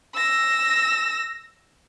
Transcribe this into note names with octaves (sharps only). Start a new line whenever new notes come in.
E6 A#6